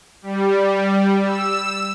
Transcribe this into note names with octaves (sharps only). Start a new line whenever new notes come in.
G3
E6